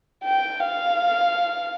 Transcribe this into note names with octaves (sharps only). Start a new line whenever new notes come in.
G5
F5